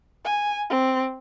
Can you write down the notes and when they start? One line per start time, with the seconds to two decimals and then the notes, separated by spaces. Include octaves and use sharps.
0.24 G#5
0.70 C4